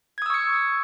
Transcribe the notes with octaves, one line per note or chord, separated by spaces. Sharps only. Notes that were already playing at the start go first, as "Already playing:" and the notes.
C#6 D#6 E6 G#6 C#7